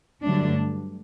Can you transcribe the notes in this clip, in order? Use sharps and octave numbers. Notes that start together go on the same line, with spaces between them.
G2 D3 F#3 A3 D4